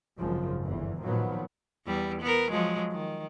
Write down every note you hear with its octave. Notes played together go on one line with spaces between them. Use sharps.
G#1 F#2 C#3 F3
G1 E2 E3
A#2 D#3 F3 F#3 B3
E2 G3
B3 A#4
F3 F#3 G#3
D#3